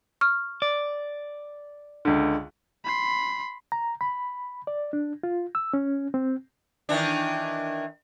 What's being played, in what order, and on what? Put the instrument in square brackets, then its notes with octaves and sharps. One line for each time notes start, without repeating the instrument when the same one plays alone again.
[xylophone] C#6 F6
[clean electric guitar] D5
[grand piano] C#2 D3
[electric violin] B5 C6
[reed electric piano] A#5
B5
D5
D4
F4
E6
C#4
C4
[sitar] D#3 E3 D4